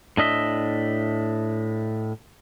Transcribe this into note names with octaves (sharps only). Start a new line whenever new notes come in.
A2 D4 D#5 E5